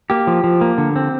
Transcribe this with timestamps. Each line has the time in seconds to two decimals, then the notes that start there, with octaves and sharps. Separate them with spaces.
0.10 A#3 G4
0.27 F3
0.44 F3
0.61 A#3
0.78 D3
0.96 C4